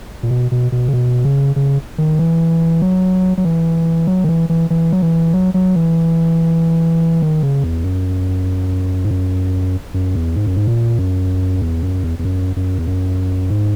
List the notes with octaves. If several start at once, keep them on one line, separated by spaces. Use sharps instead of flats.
A#2
B2
B2
B2
C#3
B2
C#3
C#3
D#3
E3
F#3
F#3
E3
F#3
D#3
E3
E3
E3
F#3
E3
F#3
F#3
E3
D#3
C#3
E2
F#2
G#2
F#2
F#2
E2
G#2
F#2
G#2
A#2
F#2
E2
F#2
E2
E2
F#2
F#2
E2
F#2
G#2